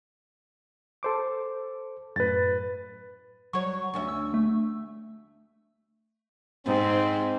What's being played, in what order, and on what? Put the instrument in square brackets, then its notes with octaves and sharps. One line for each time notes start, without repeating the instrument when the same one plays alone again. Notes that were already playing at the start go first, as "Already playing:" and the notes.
[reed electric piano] A4 C5 D6
[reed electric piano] F#2 A2 [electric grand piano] B4 A6
[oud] F#3 C#5 [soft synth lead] C#6
[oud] D2 C#4 E5
[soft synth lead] E6
A3
[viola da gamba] G#2 [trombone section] C4